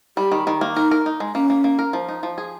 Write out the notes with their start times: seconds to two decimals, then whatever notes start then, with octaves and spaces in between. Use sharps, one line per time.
0.17 G3 G4
0.32 D#3
0.47 D#3
0.61 A#3
0.76 D#4 A#4
0.91 A#4
1.06 D#4
1.20 G#3
1.35 A#3 C#4
1.50 A#3
1.64 A#3
1.79 A#4
1.93 F3
2.08 D#4
2.23 F3
2.38 G#4